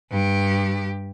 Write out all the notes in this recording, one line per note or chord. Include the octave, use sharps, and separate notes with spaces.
G2 G4